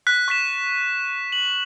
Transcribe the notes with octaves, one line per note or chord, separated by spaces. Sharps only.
F#6 B6
C#6 F#6 B6 E7
F#7